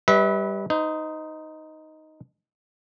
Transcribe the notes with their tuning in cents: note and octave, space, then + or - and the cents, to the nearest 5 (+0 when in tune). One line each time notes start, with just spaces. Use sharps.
G3 +0 B4 +0 E5 -40
D#4 +5 C5 -40